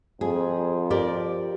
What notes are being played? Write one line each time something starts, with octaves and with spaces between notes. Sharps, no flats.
F2 G#4
G4 A#4 D5